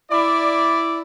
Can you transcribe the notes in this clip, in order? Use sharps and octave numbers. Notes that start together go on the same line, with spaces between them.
E4 D5